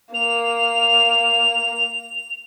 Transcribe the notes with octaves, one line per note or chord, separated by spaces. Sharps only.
A#3 F7